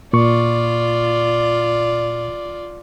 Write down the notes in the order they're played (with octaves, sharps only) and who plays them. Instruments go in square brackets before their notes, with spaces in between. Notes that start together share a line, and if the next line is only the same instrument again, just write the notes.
[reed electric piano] A#2 C#6 [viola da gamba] F4 D5